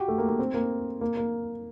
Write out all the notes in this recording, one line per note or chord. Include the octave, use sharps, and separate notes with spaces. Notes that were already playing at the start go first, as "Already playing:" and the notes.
Already playing: F#4 G4
A3
A#3
A#3
C4
A#3
A#3
A#3